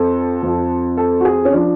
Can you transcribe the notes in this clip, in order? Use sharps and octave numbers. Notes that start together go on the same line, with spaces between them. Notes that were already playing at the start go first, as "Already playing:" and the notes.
Already playing: F2 A4
F2 F3
A4
F#4
G#4
C#4
F3 D4